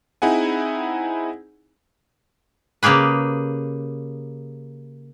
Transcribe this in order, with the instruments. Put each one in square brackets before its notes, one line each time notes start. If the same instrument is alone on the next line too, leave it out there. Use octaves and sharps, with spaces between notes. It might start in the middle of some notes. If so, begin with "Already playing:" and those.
[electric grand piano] C4 D#4 E4 G#4 F#5 G#5
[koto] C#3 A#3 G4 G#4 B4